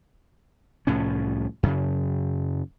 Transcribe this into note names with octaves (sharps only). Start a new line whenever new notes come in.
C2 A2 F3 C#4
F#2 C#3